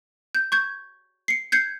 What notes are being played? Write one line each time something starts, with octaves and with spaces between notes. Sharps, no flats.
G6
C#6 G6 G#6
C7 C#7
G6 G#6 C7 C#7